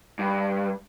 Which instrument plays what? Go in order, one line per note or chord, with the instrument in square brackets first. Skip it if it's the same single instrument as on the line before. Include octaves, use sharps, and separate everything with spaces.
[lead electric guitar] G2